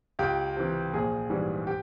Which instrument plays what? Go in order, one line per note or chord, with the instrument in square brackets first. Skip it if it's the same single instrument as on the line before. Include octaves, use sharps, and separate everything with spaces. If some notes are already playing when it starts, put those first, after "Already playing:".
[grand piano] C#2 G4
C3 E3
A#1 G#4
G#2 E3 G3
G4